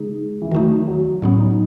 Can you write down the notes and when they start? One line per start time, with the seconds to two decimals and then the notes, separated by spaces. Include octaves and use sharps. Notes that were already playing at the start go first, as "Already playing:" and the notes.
Already playing: C#3 G#3 D#4 G#4
0.42 E3
0.51 D#3 F#3 A3 D#4
0.88 F#3
1.22 A2 F#3 B3 C#4
1.40 D#4